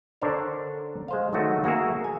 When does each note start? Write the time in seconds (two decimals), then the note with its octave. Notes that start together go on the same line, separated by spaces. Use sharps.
0.22 D3 D4 A#4 C5 C#5
1.08 G#3 C5 F5
1.33 D#3 F#3 A3 F#4
1.64 A#3 F#4 G#4 A#4 E5
2.04 G#5